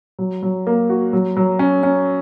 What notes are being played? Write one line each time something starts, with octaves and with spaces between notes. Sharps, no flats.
F#3
F#3
A#3
F#4
F#3
F#3
C#4
C#4